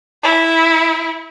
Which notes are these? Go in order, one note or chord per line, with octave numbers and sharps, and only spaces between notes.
E4